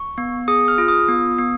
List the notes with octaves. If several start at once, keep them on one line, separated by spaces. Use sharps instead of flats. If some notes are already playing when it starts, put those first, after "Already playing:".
Already playing: C#6
B3
G#4 D#6
F6
F4
D#6
B3
B3